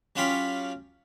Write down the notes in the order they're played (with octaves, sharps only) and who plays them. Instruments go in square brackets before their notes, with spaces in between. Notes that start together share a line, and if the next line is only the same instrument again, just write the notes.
[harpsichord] F#3 C#4 F4 G4 B5 C6